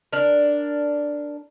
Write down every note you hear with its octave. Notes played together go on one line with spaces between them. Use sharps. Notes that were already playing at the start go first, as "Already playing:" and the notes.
D4 A#4